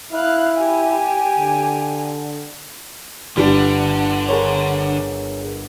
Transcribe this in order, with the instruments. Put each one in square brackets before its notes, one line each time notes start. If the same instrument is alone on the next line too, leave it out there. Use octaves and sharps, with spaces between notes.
[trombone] E4 [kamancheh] F5 F#6
[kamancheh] G4 G#5
[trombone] D3
[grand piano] G1 [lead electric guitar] D3 [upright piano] G3 D4
[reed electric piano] G#4 A#4 C#5